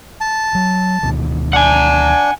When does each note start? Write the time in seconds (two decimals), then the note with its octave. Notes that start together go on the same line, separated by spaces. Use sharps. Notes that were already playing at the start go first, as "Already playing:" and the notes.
0.21 A5
0.55 F#3
1.03 D2 B2 D#3
1.53 D4 F#5 G#5